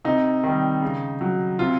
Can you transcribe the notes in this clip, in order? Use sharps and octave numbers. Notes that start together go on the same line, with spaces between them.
C3 D#4
D#3 G3
C#3
F#3
C3 F4